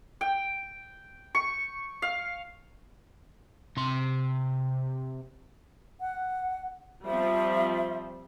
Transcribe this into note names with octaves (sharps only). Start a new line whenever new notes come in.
G5
C#6
F5
C3 C6
F#5
F3 G3 C4 E5